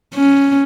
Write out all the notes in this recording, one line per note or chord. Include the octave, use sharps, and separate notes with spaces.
C#4